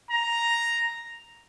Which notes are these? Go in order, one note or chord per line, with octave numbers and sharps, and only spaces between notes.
A#5